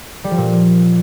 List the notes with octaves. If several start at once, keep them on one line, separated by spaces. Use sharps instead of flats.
G3
F3
A#2